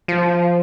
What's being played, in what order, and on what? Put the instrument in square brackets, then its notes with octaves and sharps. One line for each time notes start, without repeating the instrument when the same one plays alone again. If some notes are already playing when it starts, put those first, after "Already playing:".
[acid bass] F3